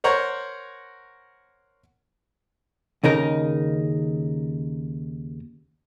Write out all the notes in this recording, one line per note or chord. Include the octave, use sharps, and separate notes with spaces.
A#4 C5 C#5 F#5 A#5 C#6
D#2 C#3 D#4 A#4